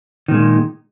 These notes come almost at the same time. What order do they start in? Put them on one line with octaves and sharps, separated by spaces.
D#3 A#2 G#3